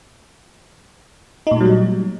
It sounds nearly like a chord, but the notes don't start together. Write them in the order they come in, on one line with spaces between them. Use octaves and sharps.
D#4 A#2 A3 F#3 G3